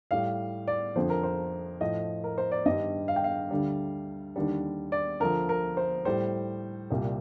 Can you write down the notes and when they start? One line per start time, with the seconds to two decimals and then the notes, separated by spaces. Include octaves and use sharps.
0.11 A2 G3 F5
0.68 D5
0.96 F2 D3 F3 C5
1.10 A#4
1.24 C5
1.81 A2 F3 D#5
2.24 A#4
2.38 C5
2.52 D5
2.66 G2 D#3 G3 D#5
3.08 F5
3.16 G5
3.24 F5
3.51 D2 D3 G3
4.36 D#2 D3 G3
4.92 D5
5.20 D2 D3 F3 A#4
5.49 A#4
5.77 C5
6.05 A2 G3 C5
6.90 C2 A#2 G3